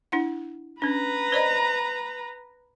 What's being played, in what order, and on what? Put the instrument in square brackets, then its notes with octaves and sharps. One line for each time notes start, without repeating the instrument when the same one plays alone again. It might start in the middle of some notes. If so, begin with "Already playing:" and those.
[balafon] D4 E4 F#5
[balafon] C#4 D4 [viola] B4 A#5
[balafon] C5 D5 D#5